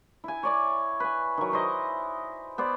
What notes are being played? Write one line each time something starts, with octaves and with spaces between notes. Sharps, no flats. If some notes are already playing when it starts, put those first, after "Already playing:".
E4 G#5
C#5 D5 D6
B4 G#5
D#3 F#3
E4 C5 D#5
B3 C5 D5